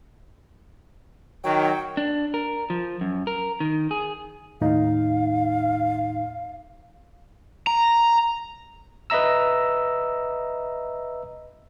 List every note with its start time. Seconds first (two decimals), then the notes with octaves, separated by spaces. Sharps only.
1.44 D#3 F#3 G5
1.97 D4
2.34 A#4
2.70 F3
3.01 F#2
3.27 A#4
3.60 D#3
3.91 G#4
4.61 D#2 A2 D#4 F5
7.67 A#5
9.10 B4 D#5 E5 A#5 E6